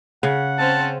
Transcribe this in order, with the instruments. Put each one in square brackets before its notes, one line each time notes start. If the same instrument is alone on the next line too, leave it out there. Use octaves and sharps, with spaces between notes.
[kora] C#3 [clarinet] F#5
[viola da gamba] C4 C#4 C5 [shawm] A5